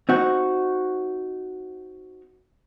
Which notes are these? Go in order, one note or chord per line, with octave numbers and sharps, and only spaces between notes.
C4 D#4 F#4